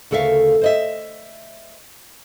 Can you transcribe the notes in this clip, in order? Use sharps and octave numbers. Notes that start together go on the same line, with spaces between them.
D2 C#3 A4 A#4 E5 F5
C5 D#5 E5